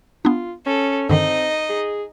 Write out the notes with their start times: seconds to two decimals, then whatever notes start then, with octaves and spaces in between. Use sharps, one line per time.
0.25 B3 D4 F4
0.66 C#4 A4
1.09 G2 D3 D#3 C4 D#4 D#5
1.69 G#4